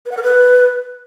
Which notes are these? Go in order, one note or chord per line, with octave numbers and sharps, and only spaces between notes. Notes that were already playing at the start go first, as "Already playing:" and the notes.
B4
F#5
A#4
B4